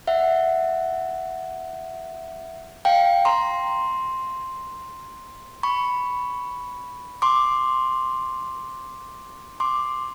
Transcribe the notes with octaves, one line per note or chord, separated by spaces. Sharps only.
E5 F#5
F5 G5
A#5 C6
B5 C#6
C6 D6
C6 D6